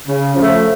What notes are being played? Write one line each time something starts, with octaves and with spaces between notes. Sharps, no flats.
C#3
F3 A3